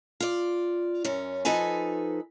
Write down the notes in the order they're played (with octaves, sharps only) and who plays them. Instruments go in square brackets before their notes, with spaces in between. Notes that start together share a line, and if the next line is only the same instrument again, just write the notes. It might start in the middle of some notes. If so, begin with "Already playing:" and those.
[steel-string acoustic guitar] F4 D5
F#2 C#4
F3 D#4 A4 B4 G#5